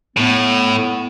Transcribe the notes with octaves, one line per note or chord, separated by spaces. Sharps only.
A2 B3